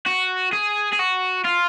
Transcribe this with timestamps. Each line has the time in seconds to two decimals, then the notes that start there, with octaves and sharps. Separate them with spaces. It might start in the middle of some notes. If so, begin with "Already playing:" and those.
0.07 F#4
0.53 G#4
0.93 G#4
0.99 F#4
1.44 F4